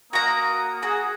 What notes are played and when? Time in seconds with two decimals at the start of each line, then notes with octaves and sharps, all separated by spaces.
0.13 A#3 F#4 A#4 A#5 D#6
0.83 F#4 G#4